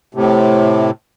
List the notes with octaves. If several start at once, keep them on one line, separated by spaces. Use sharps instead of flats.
A2 C3